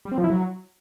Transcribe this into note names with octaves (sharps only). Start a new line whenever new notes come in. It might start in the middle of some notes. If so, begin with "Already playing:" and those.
G3
C4
F3
E4
F#3